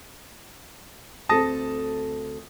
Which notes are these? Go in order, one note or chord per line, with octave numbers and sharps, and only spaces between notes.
D2 C4 A4 A5 D#6 A#6